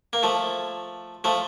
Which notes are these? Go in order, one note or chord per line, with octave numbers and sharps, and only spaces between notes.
A#3
F3 A3
F3 A3